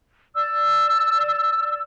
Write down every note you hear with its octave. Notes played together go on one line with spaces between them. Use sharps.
D5 E6